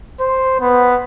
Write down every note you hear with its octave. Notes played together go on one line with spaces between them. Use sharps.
C5
B3